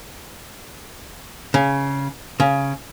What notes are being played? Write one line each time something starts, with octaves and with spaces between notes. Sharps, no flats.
C#3
C#3